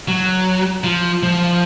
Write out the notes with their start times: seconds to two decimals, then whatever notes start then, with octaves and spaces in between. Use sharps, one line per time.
0.08 F#3
0.84 F3
1.23 F3